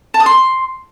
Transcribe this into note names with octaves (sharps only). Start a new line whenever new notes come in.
A5
D#6
C6